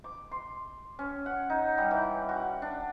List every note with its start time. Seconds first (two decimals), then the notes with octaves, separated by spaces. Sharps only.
0.04 D6
0.31 C6
0.99 C#4
1.26 F#5
1.50 D#4
1.78 G3
1.91 E3
2.29 F#4
2.62 D4